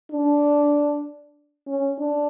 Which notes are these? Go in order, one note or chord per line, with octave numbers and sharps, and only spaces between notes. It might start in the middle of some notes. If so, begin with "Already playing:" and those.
D4
C#4
D4